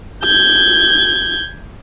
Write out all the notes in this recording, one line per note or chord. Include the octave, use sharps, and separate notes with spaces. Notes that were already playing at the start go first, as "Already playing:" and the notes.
G6 G#6